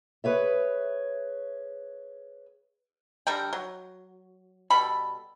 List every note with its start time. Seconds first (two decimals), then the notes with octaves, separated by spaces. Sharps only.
0.24 G#4 B4 C#5 E5
3.27 D3 G3 A#4 G5
3.53 F#3
4.70 B2 G3 A4 B5